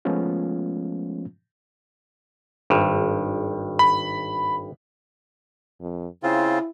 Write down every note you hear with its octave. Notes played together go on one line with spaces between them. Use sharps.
F3 G#3 A3 B3 C#4 F4
G#1 G2
B5
F2
C#3 C4 E4 F4